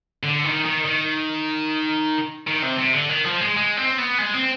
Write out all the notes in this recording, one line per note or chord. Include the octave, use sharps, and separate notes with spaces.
D3
D#3
D#3
D#3
D#3
C3
C3
D3
D#3
F3
G#3
G#3
C4
B3
G#3
C4